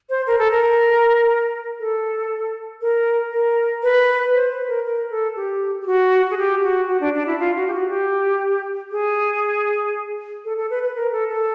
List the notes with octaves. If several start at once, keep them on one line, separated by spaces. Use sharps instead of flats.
C5
A#4
A4
A#4
A4
A#4
A#4
B4
C5
B4
A#4
A#4
A4
G4
G4
F#4
G#4
G4
F#4
F#4
D4
D4
E4
F4
F#4
G4
F#4
G4
G#4
A4
A4
B4
B4
A#4
A4
A4